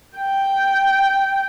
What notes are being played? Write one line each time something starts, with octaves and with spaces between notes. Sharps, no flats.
G5